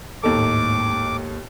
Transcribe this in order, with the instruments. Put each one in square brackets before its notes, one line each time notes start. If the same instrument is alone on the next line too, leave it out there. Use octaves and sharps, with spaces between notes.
[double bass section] G#1 A2 [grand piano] D#2 D#4 A4 [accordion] D6